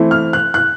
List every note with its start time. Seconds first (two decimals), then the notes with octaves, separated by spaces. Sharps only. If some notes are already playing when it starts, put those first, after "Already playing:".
Already playing: E3 A3 C4 E4
0.11 F6
0.33 F#6
0.54 F#6